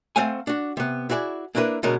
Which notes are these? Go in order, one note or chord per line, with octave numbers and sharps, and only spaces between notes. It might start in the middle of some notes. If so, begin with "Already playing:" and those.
A3 C4 C5 F5 F#5 G#5
D4 F#4
C3 B3
E4 F#4 G#4 C#5 D5
A#3 D4 E4 A#4 B4
B2 D3 G#3 C#4 A#4